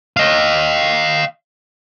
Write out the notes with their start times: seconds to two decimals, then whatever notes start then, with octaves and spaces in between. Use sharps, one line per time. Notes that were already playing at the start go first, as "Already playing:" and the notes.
0.17 D#5 F5